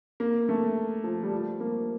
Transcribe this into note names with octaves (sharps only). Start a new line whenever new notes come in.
A#3
A3
F3
G3
F3
A#3